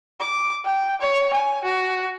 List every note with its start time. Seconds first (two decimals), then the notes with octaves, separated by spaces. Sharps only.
0.20 D6
0.65 G5
1.01 C#5
1.33 G#5
1.64 F#4